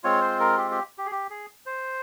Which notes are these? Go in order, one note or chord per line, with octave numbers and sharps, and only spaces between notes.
G#3 C4 F4 C#5
C5
A#4
G4
G4
G4
G#4
G4
G#4
C5